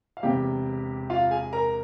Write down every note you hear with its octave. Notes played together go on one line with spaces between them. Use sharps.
F5
E1 E2 C3 G4 G5
F4 F5
G#4 G#5
A#4 A#5